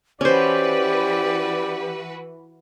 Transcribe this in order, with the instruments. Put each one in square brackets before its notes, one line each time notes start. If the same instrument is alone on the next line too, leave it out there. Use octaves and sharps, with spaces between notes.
[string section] E3 F#4 B4 [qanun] C#4 C5 [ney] G4 [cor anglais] D5